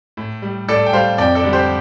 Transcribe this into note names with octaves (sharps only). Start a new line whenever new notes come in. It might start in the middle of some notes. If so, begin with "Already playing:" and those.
A2
G3
A2 A4 D5
G5
G3 C5 F5
F2 D5 G5
A4 D5
D3 G3
G4 C5